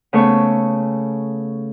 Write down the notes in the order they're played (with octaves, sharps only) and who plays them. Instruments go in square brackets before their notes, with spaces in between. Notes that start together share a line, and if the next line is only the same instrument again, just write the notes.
[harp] C#3 A3 B3 C#5